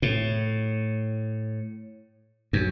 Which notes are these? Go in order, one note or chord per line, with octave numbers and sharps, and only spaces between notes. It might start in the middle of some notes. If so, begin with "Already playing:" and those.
A2
F#2